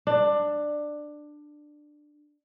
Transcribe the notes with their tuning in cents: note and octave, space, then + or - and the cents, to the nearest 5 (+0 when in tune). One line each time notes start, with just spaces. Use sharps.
D4 +15